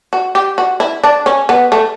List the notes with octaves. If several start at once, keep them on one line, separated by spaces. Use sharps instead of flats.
F#4
G4
F#4
E4
D4
C#4
B3
A3